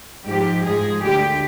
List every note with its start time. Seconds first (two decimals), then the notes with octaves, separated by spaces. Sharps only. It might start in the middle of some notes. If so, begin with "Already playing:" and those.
0.26 G#2 F3 G#3 G4
0.65 G#2 F3 G#3 G#4
1.02 D2 D3 G#3 G4